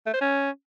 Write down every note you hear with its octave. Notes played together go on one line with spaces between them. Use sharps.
A3
C5
C#4